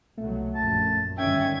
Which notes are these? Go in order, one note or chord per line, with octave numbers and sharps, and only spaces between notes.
C2 B2 F#3 A3
A#1 F#2 A5
G2 D3 D#3 C#4 E5 G5 G#6